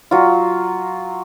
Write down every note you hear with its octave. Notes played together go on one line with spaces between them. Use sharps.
F#3 F4